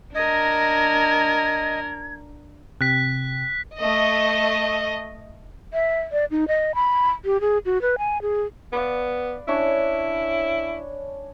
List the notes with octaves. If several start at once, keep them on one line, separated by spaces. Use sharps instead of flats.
D4 A#4 D#5 G#6
C3 F#6 B6
A3 D#5
E5
D5
D#4
D#5
B5
G4
G#4
F#4
B4
G#5
G#4
B3 B4 D5 F5
C#4 D4 E4 C#5